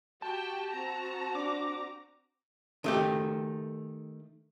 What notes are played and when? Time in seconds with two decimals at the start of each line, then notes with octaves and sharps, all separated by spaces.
0.22 F#4 G4 G5 A5
0.71 C4 F#4 A#5
1.35 D4 D6
2.84 D#3 A3 G4